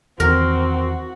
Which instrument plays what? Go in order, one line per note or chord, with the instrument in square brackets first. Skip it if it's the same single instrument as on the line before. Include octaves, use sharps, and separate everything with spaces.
[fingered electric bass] E2 D#3 [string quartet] C4 [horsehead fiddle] F#4 [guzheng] A#4